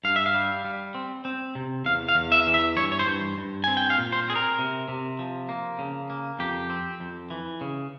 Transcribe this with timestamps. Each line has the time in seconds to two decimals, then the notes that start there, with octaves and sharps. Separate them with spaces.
0.04 G2 F5
0.16 E5
0.26 F5
0.34 G3
0.65 G3
0.95 C4
1.25 C4
1.55 C3
1.85 E2 F5
2.09 F5
2.15 E2
2.32 E5
2.47 E3
2.54 E5
2.77 G2 C#5
2.92 C#5
2.99 C5
3.07 G2
3.38 G2
3.64 C4 G#5
3.77 G5
3.90 F5
3.98 A#2
4.13 C5
4.28 C4 G#4
4.36 A#4
4.59 C3
4.88 C3
5.19 F3
5.49 A#3
5.79 C#3
6.10 A#3
6.39 F2 G4
6.70 C4
7.00 F2
7.30 E3
7.61 C#3